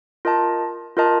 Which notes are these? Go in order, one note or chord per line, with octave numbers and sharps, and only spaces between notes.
F4 A#4 D#5 A5
F4 A#4 D#5 A5